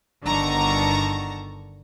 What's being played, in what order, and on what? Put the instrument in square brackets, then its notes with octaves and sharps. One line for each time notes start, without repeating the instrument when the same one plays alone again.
[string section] G1 D3 D#3 A5 A#5 C#6